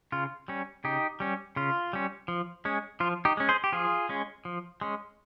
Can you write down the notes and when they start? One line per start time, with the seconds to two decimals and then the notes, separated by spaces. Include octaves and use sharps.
0.12 C#3 F4
0.48 G3 C#4
0.84 C#3 D#4 G4
1.20 G3 C#4
1.56 C#3 F4
1.93 G3 C#4
2.28 F3
2.65 G#3 C#4
3.00 F3 F4
3.25 D#4 G4
3.37 G#3 C#4
3.49 G#4 C5
3.64 G4
3.72 F3 F4 G#4
4.09 G#3 C#4
4.45 F3
4.81 G#3 C#4